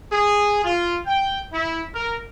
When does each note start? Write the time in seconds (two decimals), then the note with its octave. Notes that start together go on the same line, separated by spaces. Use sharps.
0.12 G#4
0.64 F4
1.06 G5
1.53 E4
1.94 A#4